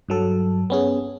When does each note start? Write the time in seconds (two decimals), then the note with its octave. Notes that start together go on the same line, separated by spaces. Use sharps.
0.09 G2 F#3 A4
0.70 B3 C#4 G#4